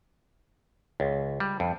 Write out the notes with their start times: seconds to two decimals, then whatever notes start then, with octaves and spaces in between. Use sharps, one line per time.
1.00 C#2
1.40 G3
1.60 F2